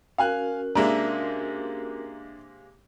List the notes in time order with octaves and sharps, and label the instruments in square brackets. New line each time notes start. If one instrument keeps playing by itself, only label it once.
[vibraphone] C#4 F#4 A#4 [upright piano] F5 G#5 F#6
[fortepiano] C3 G#3 A#3 [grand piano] D4 E5 [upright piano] A#5